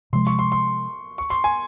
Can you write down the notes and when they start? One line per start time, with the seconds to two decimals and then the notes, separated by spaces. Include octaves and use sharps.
0.13 C3 F3 G#3 C6
0.27 C#6
0.39 C6
0.52 C6
1.18 C#6
1.30 C6
1.44 G#5